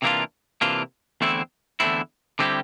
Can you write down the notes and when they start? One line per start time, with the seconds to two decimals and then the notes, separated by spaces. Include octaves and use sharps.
0.02 C3 E3 A#3 D4 F4
0.61 C3 E3 A#3 D4 F4
1.21 E2 D3 A3 C4 E4
1.80 E2 D3 A3 C4 E4
2.39 D3 G3 C4 E4 G4